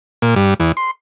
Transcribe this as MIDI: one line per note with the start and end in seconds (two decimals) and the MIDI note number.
0.22 0.35 46
0.36 0.54 43
0.60 0.72 40
0.77 0.91 84